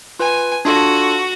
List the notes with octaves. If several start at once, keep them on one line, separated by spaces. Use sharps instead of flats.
F4 B4 G#5
D4 F4 F#4 A4